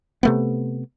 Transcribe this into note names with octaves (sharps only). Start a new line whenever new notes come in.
C3 A3 B3